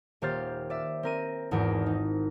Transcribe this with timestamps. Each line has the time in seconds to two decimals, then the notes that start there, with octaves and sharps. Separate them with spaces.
0.22 D#1 A#3 G4 C5 F6 A6
0.70 D5 E5
1.03 C4 A#4 D#7
1.51 G#1 E2 G#2 A#4 D7
1.86 D#4